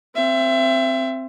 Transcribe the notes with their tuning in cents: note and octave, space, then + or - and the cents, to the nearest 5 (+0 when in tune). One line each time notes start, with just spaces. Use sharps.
C4 +0 E5 +30